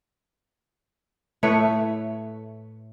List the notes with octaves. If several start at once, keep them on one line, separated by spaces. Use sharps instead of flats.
A2 A3 B4 C#5